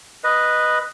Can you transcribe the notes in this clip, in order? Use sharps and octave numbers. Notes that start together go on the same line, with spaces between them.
B4 D#5